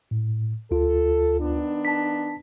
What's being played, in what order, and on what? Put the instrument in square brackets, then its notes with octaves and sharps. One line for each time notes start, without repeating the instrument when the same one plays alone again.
[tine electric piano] A2
[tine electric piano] D2 F4 [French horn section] A4
[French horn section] D#3 B3 D4
[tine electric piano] A5 B6